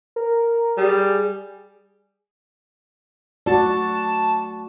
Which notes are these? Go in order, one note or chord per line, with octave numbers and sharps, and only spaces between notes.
A#4
G3 G#4
A3 F#4 D5 A5